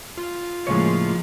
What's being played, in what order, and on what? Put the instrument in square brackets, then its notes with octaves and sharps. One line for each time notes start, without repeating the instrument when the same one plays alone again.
[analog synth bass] F4
[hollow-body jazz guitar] A2 C#3 C#5 [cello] F3 [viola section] G#3 A#3